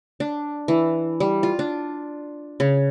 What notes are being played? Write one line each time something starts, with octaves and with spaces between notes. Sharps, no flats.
D4
E3
G3
F4
D4
C#3